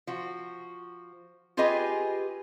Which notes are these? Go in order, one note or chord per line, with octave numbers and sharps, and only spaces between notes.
F3 F#4
F4 G4 G#4 B4 D#5 G5